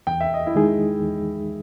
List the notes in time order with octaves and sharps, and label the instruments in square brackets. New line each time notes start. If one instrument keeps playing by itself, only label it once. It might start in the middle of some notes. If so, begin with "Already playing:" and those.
[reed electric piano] E2 [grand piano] G5
[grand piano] E5
D#5
E4 E5
[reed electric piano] D#3 G#3 D#4 G#4
E2